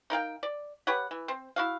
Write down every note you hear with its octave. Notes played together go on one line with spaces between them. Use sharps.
D#4 A#4 F5 G5
D5
G4 B4 C#5 F#5
E3
C4 C5
E4 F#4 F5